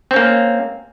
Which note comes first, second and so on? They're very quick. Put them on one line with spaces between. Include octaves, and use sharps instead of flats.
C4 C#4 A#3